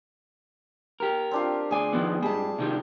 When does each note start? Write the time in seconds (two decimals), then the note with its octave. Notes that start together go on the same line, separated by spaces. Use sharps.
1.00 G4 A#4
1.31 C4 D4 F4
1.71 D2 G#4 D5 G#5
1.93 D#3 F3 B3
2.23 G#2 G3 G#4 A5
2.58 C3 D#3 G3